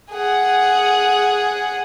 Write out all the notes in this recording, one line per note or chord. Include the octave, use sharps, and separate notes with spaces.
G#4 F#5